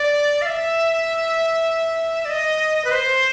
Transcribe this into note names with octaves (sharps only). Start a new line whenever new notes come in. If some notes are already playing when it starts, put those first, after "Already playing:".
Already playing: D5
F5
E5
D5
D#5
B4
C5